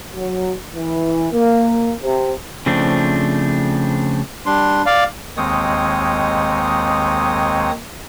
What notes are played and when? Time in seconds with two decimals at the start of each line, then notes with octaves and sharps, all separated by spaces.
0.15 F#3
0.74 E3
1.32 A#3
2.02 C3
2.66 C#3 F3 A3 C4 D4
4.46 G3 D4 C6
4.86 D5 F5
5.37 D#2 D#3 G#3 C4 C#5 D#6